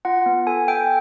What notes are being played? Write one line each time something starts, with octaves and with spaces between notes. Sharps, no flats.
F4 F#5
B3
A4 G#5
A4 G5